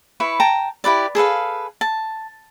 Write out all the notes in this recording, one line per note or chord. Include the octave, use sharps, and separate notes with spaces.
E4 B4 C#6
G5 A5 A#5
E4 G4 B4 D5
G#4 A4 B4 F5
A5